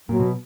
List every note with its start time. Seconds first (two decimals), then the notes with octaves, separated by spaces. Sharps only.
0.09 A#2 F#3
0.20 B2